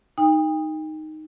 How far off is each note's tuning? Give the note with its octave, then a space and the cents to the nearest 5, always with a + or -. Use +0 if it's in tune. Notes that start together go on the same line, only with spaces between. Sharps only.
D#4 +0 G5 +40 D#6 +0